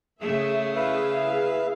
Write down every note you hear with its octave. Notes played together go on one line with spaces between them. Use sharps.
C#3 A3 G#4 E5
E4 G#4 B4 E5 F5